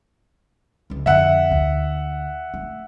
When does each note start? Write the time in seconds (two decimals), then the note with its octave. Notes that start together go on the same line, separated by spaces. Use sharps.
0.90 C#2 E3
1.06 F2 D3 E5 F#5
1.51 D2
2.54 A3